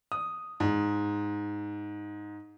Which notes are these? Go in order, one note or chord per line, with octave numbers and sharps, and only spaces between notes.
D#6
G#2